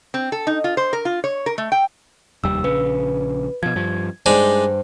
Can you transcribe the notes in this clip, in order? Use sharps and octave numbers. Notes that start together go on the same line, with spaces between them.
C4
A4
D#4
F4
C5
A#4
F4
C#5
A#4
A3
G5
F1 D#2 G3 E6
A#1 C#3 B4
B2 F3 G#6
G2 F3
G2 G#3 D4 D#4 C5